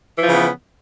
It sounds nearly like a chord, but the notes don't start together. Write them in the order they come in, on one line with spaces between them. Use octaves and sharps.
E3 F3 C#3 B3